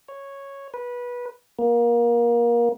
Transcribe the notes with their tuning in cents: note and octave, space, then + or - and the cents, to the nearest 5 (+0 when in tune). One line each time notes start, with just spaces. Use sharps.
C#5 -5
B4 -20
A#3 +25